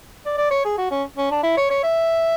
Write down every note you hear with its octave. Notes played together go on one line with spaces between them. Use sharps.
D5
D5
C#5
G#4
F#4
C#4
C#4
D4
E4
C#5
C#5
E5